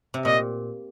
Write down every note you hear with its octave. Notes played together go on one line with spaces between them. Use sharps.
C3
A#2 D#5